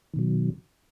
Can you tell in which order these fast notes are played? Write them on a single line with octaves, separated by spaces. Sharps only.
D#3 B2 F#3